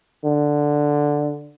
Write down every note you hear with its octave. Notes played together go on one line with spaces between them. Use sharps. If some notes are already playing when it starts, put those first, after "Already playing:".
D3